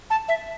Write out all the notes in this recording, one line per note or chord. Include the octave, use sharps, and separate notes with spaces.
A5
E5